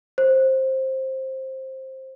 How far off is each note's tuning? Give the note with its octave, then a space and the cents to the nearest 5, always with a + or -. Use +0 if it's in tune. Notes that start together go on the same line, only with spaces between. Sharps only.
C5 +15